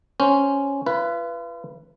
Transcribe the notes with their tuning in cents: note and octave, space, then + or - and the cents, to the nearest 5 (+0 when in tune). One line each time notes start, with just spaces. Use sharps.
C#4 +0 C5 +0
F4 -45 B4 +0